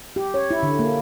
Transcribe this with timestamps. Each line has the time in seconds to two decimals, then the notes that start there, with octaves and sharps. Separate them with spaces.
0.16 G4
0.34 C#5
0.51 E4
0.63 D3
0.79 A#3